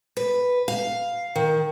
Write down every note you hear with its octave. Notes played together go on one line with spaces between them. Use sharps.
B4
F5
D#3